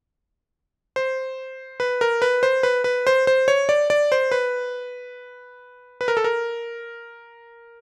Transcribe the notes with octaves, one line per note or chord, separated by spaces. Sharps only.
C5
B4
A#4
B4
C5
B4
B4
C5
C5
C#5
D5
D5
C5
B4
B4
A#4
A4
A#4